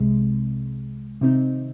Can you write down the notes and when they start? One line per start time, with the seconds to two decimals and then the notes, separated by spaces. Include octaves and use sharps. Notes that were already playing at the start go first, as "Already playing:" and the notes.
Already playing: C2 C3 G#3
1.21 C3 D#3 C4 D#4